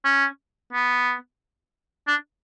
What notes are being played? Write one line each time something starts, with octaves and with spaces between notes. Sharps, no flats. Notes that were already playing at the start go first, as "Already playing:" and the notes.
C#4
B3
D4